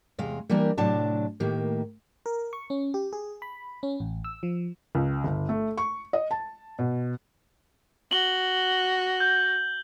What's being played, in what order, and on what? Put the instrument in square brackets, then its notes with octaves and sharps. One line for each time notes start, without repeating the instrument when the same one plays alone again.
[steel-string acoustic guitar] E2 C3 G#3 F5
E3 G3 A#3 D4 G4 A#4
A2 C3 F#3 D4 A5
A2 D#3 A#3 G4
[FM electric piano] A#4
C#6
C#4
G4
G#4
B5
C#4
A1
E6
F3
[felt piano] C#2
G1
A3
C#6
D#5
A5
B2
[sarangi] F#4 [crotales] F#7 G7
[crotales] G6